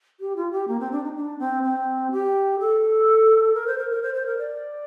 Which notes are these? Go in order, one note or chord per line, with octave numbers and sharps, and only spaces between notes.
G4
F4
G4
A#3
C4
D4
D#4
D4
C4
C4
G4
A4
A#4
C5
A#4
A#4
C5
C5
A#4
D5